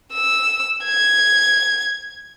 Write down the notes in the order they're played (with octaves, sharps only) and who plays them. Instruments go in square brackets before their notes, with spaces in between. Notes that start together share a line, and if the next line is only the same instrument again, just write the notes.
[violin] E6
G#6